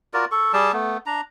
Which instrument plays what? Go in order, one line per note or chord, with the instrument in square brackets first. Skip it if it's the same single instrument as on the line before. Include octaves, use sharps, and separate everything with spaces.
[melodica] F4 F#4 A#4 D5
A4 C#6
G3 G#4 D5 A5
A3 B3
D4 A#5